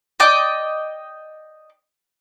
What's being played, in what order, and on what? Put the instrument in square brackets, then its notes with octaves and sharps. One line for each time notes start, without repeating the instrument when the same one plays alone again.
[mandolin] D5 D#5 G5 D6